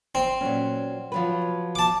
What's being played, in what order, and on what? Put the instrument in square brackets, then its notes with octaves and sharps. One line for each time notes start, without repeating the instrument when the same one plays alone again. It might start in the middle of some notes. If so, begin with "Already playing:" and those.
[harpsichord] C4
[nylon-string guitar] A#2 F#3 C#4
F3 F#3 B4
[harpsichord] A5 D6